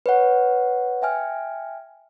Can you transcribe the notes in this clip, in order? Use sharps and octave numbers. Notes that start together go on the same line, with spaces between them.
B4 C#5 F#5
E5 G5 G#5 F6